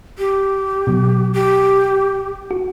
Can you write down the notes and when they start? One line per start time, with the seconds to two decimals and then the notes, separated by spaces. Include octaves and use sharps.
0.18 G4
0.87 B2 F#3
1.33 G4
2.51 F#4